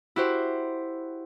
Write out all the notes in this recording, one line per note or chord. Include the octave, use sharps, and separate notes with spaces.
E4 F#4 G4 C5